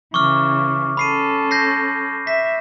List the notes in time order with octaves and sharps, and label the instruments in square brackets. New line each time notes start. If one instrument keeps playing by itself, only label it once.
[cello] C#3 E3 [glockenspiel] C#6 D6 F6
[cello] C#4 A4 [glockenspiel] B5 C7 D#7
[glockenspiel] G6 A#6 C7
[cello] E5 [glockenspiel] B6